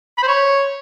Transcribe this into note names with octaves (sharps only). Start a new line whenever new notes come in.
B5
C5
C#5